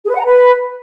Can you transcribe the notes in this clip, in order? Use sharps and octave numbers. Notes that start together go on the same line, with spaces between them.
G#4
B4
F#5
A#5
B4